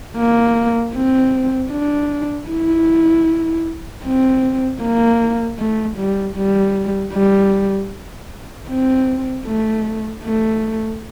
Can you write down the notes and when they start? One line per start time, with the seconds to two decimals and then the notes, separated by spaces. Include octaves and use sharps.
0.17 A#3
0.94 C4
1.71 D4
2.49 E4
4.04 C4
4.81 A#3
5.58 A3
5.97 G3
6.36 G3
7.13 G3
8.69 C4
9.46 A3
10.24 A3